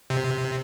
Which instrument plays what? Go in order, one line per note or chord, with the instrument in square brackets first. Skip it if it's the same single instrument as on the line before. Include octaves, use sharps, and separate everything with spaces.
[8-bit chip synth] C3